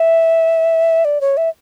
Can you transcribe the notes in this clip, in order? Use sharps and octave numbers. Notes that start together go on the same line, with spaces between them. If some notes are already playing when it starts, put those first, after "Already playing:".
Already playing: E5
D5
C#5
E5